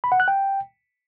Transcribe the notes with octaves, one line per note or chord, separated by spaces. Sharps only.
B5
F#5
F#6
G5